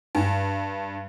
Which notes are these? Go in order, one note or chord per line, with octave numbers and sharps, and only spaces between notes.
G2